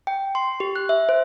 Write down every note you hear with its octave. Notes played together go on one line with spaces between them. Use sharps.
G5
C6
G4
F#6
E5
C5